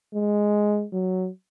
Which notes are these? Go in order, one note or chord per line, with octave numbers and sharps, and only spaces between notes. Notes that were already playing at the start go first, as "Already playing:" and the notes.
G#3
F#3